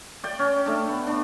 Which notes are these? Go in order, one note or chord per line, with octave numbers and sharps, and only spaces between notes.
D5 G5
C#4
A3 D4
B3
D4